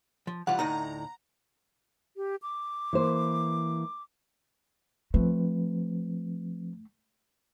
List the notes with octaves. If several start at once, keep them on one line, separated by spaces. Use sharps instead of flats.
F3
E3 G3 F4 F#5
D2 A2 D#4 A#5
G4
D6
E3 A#3 C5
F3 A3 C4 B4